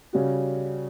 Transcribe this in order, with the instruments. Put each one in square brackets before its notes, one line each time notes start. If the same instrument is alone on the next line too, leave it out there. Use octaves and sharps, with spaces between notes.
[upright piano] C#3 G3 C#4 F#4